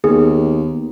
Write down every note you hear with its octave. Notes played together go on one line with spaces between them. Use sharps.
D#2 B3 G#4